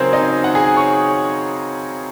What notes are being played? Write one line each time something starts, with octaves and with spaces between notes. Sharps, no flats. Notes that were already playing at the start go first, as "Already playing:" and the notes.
Already playing: C#3 F#3 C4 D#4 G#4 A#4 C5 C#5
D#4 D#5
F#5
G#4 G#5
C#5 C#6